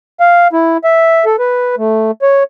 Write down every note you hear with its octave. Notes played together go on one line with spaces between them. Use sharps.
F5
E4
E5
A4
B4
A3
C#5